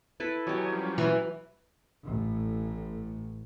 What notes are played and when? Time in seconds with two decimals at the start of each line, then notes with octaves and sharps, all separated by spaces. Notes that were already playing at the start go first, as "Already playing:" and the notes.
0.20 E4 A4 B4
0.47 F#3 G4 C#5 D#5 G#5
0.72 F3 G3 C#4
0.98 E3
2.04 A1 A2